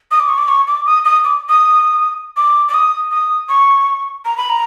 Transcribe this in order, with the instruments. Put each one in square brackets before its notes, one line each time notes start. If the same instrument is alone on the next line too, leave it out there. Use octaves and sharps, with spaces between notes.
[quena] D#6
D6
C#6
D6
C#6
D6
D#6
D#6
D6
D#6
D6
D6
D#6
D#6
C#6
A#5
B5
A#5